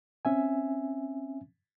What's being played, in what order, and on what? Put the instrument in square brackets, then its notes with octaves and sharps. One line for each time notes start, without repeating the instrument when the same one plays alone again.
[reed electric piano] C4 C#4 E5 G#5